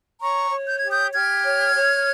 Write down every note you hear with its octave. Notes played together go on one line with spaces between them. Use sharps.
C#5 A#5 C#6
C#5
G6
G4 G#6
D#6 G6
G4 F6 G#6
C#5
C#5